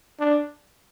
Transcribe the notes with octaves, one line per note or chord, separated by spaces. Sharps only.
D4